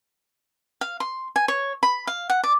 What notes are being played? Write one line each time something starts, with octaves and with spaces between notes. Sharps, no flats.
F5
C6
G#5
C#5
B5
F5
F#5
D5